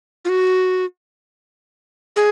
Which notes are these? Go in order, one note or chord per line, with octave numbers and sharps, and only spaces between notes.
F4
F#4
G#4